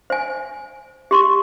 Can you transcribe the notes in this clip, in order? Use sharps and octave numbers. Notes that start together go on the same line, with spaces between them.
C5 G#5
G4 C6 C#6